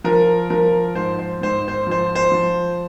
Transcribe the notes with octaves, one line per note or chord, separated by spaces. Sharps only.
F3 A#4
F3 A#4
G#2 C5
C5
G#2 C5
C5
F3 C5
C5
F3